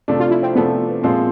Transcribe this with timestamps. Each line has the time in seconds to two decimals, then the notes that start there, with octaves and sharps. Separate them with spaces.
0.08 C3 F3 A3 D4
0.20 F4
0.31 E4
0.43 C4
0.55 C3 F3 A3 B3 D4
1.03 A#2 F3 G#3 C4